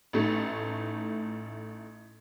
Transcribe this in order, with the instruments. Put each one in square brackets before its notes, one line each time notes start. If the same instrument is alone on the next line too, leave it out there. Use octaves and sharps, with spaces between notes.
[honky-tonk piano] A1 A3 D#4